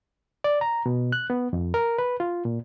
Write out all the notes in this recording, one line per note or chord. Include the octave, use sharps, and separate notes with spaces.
D5
A#5
B2
F#6
B3
F2
A#4
B4
F4
A#2